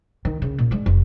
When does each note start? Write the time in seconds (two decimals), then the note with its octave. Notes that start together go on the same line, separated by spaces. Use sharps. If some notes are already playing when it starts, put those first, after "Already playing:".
0.25 D#3
0.42 C#3
0.58 A#2
0.71 G#3 D4
0.86 F1